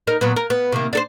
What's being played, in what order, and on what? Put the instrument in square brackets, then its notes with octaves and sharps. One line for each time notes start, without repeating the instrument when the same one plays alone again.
[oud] D#4 A#4
A#2 F#3 B3
A#4
B3
C3 D#3 A#3
D4 A4 C5